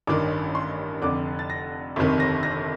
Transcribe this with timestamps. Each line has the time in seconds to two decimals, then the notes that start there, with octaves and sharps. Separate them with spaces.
0.07 A1 G2 D#3 D6
0.55 C6
1.02 F1 F2 D3 D6
1.39 A6
1.50 A#6
1.96 G1 F2 C3 D#3
2.20 A#6
2.43 A#6